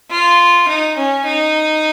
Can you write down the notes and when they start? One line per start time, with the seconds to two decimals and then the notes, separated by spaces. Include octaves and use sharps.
0.11 F4
0.68 D#4
0.97 C#4
1.26 D#4